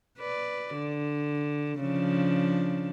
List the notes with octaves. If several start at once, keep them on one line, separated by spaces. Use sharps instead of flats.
B4 D5
D3
C#3 F3 D4